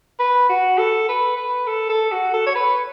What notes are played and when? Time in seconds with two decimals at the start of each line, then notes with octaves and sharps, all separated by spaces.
0.19 B4
0.49 F#4
0.78 A4
1.09 B4
1.37 B4
1.67 A4
1.89 A4
2.12 F#4
2.34 A4
2.46 C#5
2.55 B4